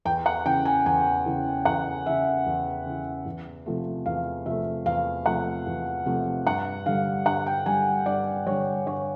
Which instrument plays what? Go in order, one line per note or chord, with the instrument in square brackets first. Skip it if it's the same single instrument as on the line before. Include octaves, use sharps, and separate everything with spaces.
[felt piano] E2 G5
F#5
C#3 E3 G5
G#5
E2 G#5
C#3 E3
E2 F#5
C#3 E3 E5
E2
C#3 E3
E2
C3 F3 A3
E2 F5
C3 F3 A3 E5
E2 F5
C3 F3 A3 F#5
E2
C3 F3 A3
G2 F#5
D3 G3 F5
G2 F#5
G5
D3 G3 G#5
G2 D5
D3 G3 C#5
G2 C#5